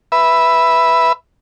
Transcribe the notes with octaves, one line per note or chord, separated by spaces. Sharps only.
B4 E5